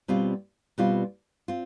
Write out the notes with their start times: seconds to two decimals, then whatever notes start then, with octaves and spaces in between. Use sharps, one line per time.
0.08 B2 G3 C4 F4
0.78 B2 G3 C4 F4
1.48 C4 F4